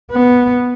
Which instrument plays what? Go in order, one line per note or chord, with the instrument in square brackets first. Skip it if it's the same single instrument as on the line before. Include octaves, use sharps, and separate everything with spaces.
[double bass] B3